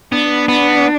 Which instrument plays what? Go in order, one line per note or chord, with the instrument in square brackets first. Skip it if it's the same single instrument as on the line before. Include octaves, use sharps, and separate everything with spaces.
[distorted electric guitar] B3 [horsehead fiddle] D4
[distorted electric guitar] B3